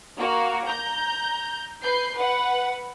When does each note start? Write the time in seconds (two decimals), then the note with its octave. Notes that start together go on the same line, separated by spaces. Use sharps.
0.18 A#3 F#4
0.66 A#5 G6
1.83 B4 G6 C7
2.13 B4 F#5